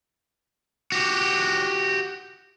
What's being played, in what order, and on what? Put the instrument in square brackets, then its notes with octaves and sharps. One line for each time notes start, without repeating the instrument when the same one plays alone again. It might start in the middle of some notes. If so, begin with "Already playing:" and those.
[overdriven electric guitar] F#4 G4